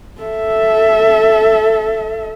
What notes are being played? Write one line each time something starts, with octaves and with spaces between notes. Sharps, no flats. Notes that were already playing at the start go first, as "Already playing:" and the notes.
A4 E5